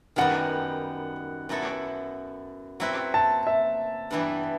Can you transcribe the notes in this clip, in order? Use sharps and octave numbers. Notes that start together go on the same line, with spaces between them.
F#2 D#3 G3 B3 F#5
F#2 F#3 B3 E4 A4
F#3 C4 E4 B4
A5
E5
G2 E3 G3 B3 E4